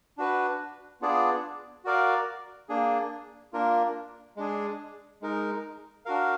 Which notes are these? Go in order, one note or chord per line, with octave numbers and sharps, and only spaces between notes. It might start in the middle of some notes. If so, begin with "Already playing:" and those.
D4 F#4 B4
B3 D4 F4 G#4 D5
F#4 A#4 D5 F5
A#3 D4 G#4
A#3 D4 F4 A#4
G#3 D4 G#4
G#3 D#4 A#4
D4 F#4 A#4 F5